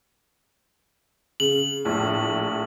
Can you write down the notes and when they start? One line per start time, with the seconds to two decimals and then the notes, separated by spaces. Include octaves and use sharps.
1.40 C#3 F#7
1.85 A#1 A2